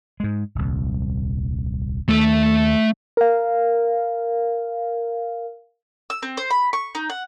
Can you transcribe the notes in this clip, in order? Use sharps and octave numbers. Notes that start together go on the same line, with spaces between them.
G#2 G#3
D#1 C2
D#2 D#3 A3 A5
A#4 F5
E6
C4
C5
B5
C#6
D#4
F#5